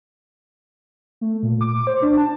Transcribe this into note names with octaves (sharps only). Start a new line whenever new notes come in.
A3
A#2
D6
C5
D4
A5